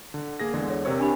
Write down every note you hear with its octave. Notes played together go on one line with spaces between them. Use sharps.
D3
A#3 G#4 A#6
E2 D3 G#3 D5
C#5
C3 A#4 C5 C#5 E6
D4 G4 B5